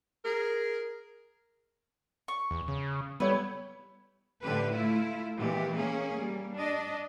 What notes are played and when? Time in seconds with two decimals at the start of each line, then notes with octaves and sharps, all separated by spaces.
0.24 G#4 A#4
2.28 C#6
2.51 E2
2.68 C#3
3.20 G3 A3 B3 E4 B4 C#5
4.41 A2 D3 G4 B4
4.71 A3 E4 F4
5.37 A#2 E3 G#3 B3 G4
5.74 A#3 C#4 G#4
6.17 G3 A#3
6.55 D4 D#5